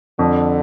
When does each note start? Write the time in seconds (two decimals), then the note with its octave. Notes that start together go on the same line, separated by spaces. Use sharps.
0.19 F2 D3